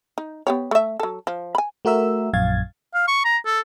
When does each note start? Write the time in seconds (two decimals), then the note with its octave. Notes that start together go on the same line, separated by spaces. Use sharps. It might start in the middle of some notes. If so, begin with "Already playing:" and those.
0.18 D#4
0.47 B3 G4 C#5
0.71 A3 E5
1.00 F#3 A4
1.27 F3
1.55 G#5 B5
1.85 A3 F#4 A#4 E5 E6
2.33 A#1 F#2 F5 G#6 A6
2.94 F5
3.08 C#6
3.25 A#5
3.46 A4